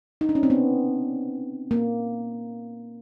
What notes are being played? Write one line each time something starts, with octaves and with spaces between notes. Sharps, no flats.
D#4
D4
C#4
C4
B3
A#3